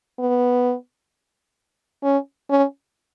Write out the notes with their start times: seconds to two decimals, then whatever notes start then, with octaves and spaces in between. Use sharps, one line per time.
0.19 B3
2.03 C#4
2.50 C#4